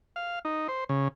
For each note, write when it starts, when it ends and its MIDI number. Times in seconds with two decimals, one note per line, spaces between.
0.16 0.39 77
0.45 0.68 63
0.68 0.84 72
0.89 1.08 49